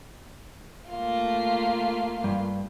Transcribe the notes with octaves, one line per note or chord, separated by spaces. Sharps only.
A3 A#3 F4
G2